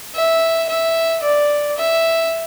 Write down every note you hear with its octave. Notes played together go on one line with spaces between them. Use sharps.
E5
E5
D5
E5